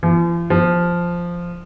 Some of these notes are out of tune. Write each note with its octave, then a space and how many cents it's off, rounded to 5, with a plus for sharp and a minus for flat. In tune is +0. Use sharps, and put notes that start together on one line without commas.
F3 -45
F3 -5